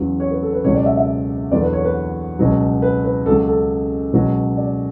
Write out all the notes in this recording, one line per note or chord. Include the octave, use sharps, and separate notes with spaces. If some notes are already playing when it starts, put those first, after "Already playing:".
Already playing: E2 C#3 F#3
C#5
B4
A4
B4
C#2 B2 F#3 C#5
D5
E5
E5
E2 D3 F#3 D5
B4
C#5
B4
C#2 B2 F#3
B4
B4
C#2 C#3 F#3 A4
A4
C#2 B2 F#3
D5